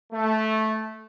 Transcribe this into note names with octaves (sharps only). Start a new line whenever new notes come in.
A3